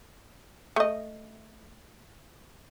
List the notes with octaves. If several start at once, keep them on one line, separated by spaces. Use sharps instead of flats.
A3 D#5